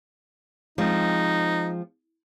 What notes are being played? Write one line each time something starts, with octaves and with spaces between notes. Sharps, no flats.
F3 G#3 C4 D#4